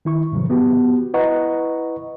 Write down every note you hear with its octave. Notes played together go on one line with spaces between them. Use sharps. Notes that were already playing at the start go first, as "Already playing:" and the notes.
D#3 E4 C#6
F2 A2 C#3 E3 F#3
B3 F#4 G4
E4 B4 D#5 F#5 A#5 C#6